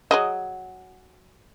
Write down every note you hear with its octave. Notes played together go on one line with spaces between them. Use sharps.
F#3 G#4 D#5